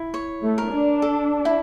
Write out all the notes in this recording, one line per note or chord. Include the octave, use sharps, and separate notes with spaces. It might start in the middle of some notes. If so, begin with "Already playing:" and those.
Already playing: E4
C#5
A3
A#4
D4
A4
E4